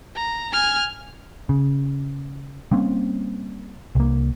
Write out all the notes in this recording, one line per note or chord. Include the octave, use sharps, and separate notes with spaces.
A#5
G#5 F6
C#3
G3 A#3 C4 C#4
C2 A#3